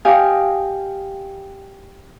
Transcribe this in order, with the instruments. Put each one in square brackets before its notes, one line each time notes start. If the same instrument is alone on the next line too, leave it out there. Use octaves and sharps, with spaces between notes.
[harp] G4 D#5 F5 G#5